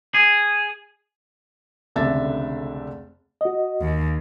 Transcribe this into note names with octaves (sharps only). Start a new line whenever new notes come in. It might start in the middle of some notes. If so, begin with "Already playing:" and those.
G#4
F1 C#2 D3 D4 E5 A6
F#4 D#5
D#2